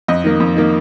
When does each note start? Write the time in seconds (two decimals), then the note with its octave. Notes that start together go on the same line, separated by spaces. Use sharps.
0.08 F2 D#5
0.24 D#3 A#3
0.40 F2
0.56 D#3 A#3